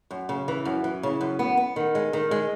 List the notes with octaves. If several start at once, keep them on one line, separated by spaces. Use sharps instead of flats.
F#2
C#3
E3
F#2
E3
C#3
F#2
B3
B3
D#3
G#3
D#3
G#3